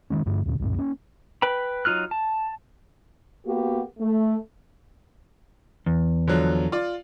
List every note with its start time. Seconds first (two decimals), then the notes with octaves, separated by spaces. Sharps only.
0.10 D#3 G#3 C#4
0.26 G2 D3 A3
0.46 D#2 A#2 D3
0.60 C2 F#2 A2
0.77 A#3 C#4
1.42 B4 G5 B5
1.85 F#3 D#4 F4 F6 F#6
2.11 A5
3.45 A#3 B3 F#4 G4
3.99 A3
5.86 E2
6.28 D3 F3 F#3
6.72 F4 D5